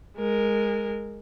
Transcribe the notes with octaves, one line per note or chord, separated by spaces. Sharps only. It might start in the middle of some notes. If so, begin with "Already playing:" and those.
G#3 A#4